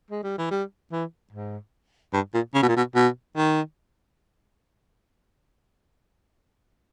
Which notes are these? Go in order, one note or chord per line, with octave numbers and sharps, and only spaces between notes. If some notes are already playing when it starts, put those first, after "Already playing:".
G#3
G3
E3
G3
E3
G#2
G2
A#2
C#3
B2
A#2
B2
B2
D#3